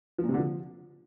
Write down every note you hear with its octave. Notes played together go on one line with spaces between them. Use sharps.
F3
A#2
C3
D3
F3